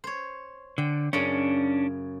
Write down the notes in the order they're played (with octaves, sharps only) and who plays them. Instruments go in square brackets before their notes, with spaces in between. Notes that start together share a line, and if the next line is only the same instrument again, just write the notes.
[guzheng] C5 C#5
[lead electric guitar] D3 [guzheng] G5
[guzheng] F#2 C#3 B5 [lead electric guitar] C#4 D4